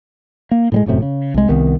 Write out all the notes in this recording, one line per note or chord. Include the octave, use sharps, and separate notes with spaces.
A#3
A2 G3 G#3
E1 F#2 A2 C3
C#3
C2 G#3
C2 D#3 B3